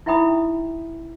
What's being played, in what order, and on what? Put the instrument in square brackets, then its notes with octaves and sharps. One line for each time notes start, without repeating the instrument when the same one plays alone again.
[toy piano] D#4 E4 E5 G5 B5 D#6